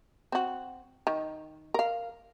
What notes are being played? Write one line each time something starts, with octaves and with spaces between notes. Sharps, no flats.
C4 F#4
D#3
A#4 F5